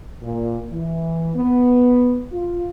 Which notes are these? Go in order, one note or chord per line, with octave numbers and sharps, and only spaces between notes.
A#2
E3
B3
F4